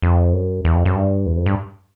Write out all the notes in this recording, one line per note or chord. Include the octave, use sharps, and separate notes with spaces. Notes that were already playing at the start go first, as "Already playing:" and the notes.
F2
F#2
E2
F2
F#2
G2
E2
F2
G2